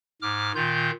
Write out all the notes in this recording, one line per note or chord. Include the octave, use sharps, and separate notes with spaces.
G#2 D6 F6
A#2 D#3 F4 G6